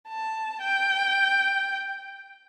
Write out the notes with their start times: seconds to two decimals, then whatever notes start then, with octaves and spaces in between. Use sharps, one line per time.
0.08 A5
0.61 G5